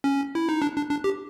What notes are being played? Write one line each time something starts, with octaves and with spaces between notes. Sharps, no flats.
C#4
E4
D#4
D4
D4
D4
G4